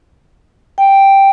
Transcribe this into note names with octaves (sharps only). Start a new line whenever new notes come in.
G5